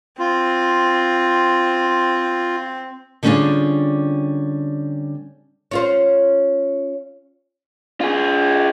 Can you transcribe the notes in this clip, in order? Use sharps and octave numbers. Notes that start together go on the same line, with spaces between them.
C4 F4
D3 G3 C#4 D4 F4 G#4
C#4 F4 C5
F4 G#4